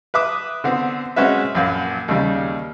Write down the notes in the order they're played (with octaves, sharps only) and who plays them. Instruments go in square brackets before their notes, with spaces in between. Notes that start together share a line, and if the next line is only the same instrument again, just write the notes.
[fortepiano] B4 E5 D6 D#6
D3 B3 C4
G#3 C4 C#4 F#4 B4 E5
A#1 F#2 F5
D#2 C#3 G3